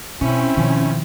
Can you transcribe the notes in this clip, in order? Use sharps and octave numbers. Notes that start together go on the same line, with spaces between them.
B2 C4 C#4 E4
B2 D#3 F3